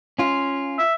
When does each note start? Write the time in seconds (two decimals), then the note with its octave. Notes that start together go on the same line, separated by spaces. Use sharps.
0.19 C#4 F4
0.78 E5